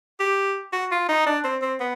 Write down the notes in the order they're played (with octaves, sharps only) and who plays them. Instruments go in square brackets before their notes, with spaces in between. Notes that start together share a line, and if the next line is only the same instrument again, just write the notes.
[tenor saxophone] G4
F#4
F4
D#4
D4
C4
C4
B3